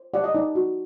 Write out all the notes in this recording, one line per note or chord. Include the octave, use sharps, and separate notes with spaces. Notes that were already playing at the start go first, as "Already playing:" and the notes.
Already playing: C5
G4 D5 F#5
D#5
D#4 D5
F#4